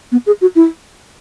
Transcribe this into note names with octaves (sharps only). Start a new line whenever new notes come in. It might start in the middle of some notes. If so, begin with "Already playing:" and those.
B3
G#4
F#4
E4